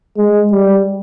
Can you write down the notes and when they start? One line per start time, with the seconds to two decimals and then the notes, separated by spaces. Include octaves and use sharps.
0.17 G#3
0.52 G3